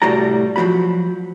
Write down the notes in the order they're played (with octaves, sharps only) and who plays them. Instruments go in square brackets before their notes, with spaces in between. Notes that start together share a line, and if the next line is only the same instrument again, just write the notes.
[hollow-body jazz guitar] C2 A2 G3 F#4 D5 A#5
F3 F#3 A3 F#4 B5